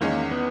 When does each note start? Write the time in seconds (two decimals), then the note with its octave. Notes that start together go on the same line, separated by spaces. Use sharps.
0.01 E2 D#3 G#3 A#3 C#4
0.31 B3